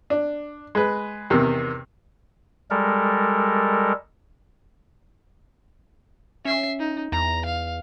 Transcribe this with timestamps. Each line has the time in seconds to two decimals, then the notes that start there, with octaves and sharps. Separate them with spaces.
0.10 D4
0.75 G#3 B4
1.30 E2 C3 D#3
2.71 G3 G#3 A4 A#4
6.45 C#4 E5 C7
6.80 D#4
7.12 E2 A#5
7.45 F5